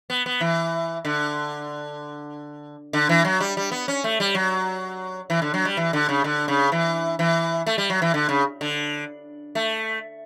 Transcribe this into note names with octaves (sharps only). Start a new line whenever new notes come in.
B3
B3
E3
D3
D3
E3
F#3
G3
G3
B3
C#4
A3
G3
F#3
E3
D3
F#3
G3
E3
D3
C#3
D3
C#3
E3
E3
A3
G3
F#3
E3
D3
C#3
D3
A3